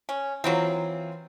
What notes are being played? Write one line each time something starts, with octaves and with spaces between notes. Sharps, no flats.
C#4
E3 F#3 A#3 C4 E4 F4